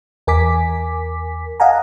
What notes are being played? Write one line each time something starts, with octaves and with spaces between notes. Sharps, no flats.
E2 A#4 G#5 D6 B6
D#5 F5 F#5 G#5 A#5